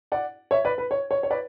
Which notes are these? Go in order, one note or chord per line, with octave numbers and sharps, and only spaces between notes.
D5 F#5
C#5 E5
B4 D5
B4
C#5
C#5
C#5
B4 D5